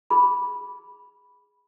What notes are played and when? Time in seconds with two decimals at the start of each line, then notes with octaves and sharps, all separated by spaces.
0.10 G#4 B5